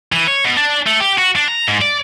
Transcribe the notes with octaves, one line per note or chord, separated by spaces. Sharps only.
E3
C#5
B2
D4
A3
G4
F#4
D4
A#5
G#2
D5